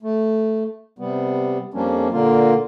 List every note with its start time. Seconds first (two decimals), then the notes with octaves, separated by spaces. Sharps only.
0.03 A3
0.99 C3 G3 B3
1.74 F2 F3 G3 A#3 C#4 D4
2.12 A#2 D3 A#3 F4